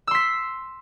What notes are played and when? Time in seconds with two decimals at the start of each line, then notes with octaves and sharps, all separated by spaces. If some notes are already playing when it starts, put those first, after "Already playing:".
0.07 E6
0.11 C6
0.15 B6